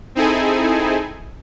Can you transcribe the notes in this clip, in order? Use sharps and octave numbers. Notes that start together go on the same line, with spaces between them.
C4 D#4 E4 G#4 A4 G#5